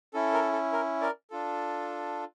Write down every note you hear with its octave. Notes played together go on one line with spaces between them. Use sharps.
C#4 E4 A4
A#4
A4
A#4
A#4 D5
D4 F4 A4